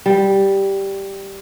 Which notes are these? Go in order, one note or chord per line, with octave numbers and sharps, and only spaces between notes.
G3